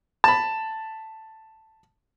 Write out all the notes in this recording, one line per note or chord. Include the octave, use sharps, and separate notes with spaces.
A5 B5